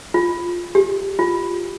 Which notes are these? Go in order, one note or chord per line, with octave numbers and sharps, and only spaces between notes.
F4
G4
F4